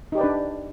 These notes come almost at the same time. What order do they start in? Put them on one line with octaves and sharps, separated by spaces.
D#4 G4 D5 B4 D4